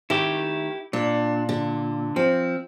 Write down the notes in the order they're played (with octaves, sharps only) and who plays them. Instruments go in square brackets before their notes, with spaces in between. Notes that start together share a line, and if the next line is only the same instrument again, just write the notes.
[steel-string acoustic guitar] D#3 A3 [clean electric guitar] E4 G4
[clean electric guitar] A#2 [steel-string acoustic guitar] D4
[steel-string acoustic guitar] D3
[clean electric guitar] F3 [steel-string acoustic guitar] C4